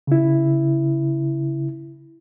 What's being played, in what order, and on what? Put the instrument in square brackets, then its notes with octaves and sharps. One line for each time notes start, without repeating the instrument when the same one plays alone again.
[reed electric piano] C#3 E4